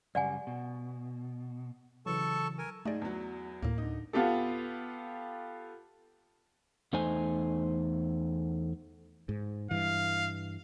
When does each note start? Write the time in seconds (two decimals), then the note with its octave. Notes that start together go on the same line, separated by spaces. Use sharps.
0.15 F#2 C#3 G3 D5 F#5 G#5
0.47 B2
2.06 C#3 E3 F#3 A4 A5 C#6
2.58 A#4 G#5
2.85 G#2 A3 D#4 G#4 D5
3.01 E2 F#3
3.62 D2 A2 A#3
3.78 D3 D#4
4.13 B3 F4 G4 A4
6.93 E2 A3 D#4 C5 G#5
9.29 G#2
9.71 G2 E3 F5